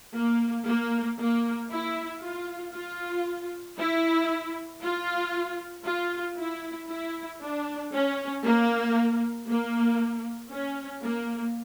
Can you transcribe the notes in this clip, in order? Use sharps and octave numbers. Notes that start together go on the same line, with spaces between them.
A#3
A#3
A#3
E4
F4
F4
E4
F4
F4
E4
E4
D4
C#4
A#3
A#3
C#4
A#3